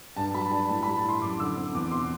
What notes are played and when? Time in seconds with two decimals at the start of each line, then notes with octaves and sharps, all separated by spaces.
0.16 G2 A5
0.34 F#3 B5
0.51 D4 A5
0.69 A2 A5
0.83 G3 B5
0.96 A5
1.05 E4 C6
1.21 F#2 D6
1.39 D3 E6
1.57 C4
1.75 E2 D6
1.92 B2 C6